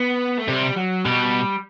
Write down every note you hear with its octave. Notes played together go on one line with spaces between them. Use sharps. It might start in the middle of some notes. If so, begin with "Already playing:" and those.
Already playing: B3
A3
C3 G3
F#3
B2 G3